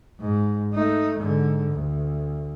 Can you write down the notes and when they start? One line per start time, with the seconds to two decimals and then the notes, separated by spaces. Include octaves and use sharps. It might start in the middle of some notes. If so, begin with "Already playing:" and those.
0.20 G#2
0.74 A3 D#4
1.18 G#2 D3
1.71 D2